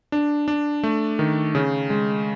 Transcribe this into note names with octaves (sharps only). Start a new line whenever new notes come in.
D4
D4
A3
D#3
C#3
G#3